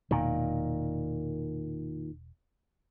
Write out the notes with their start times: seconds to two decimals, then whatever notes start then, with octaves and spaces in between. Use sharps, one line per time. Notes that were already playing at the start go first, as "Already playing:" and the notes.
0.11 E1 A#2 D#3